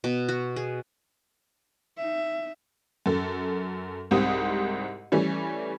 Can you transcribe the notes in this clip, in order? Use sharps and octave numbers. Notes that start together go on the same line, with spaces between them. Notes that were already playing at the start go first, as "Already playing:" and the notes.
B2
F#4
G#4
D#4 E5
F#2 A4
C2 G#2 C4 G4 D#6
E3 G3 A3 C#4